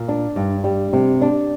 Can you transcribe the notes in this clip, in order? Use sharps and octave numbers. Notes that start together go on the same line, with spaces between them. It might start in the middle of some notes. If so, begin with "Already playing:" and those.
Already playing: A#2
D4
G2
G3
C3
D4